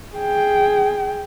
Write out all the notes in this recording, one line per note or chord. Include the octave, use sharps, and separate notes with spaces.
G#4 G5